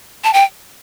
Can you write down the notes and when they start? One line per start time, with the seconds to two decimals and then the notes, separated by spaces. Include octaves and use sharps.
0.24 A5
0.33 G5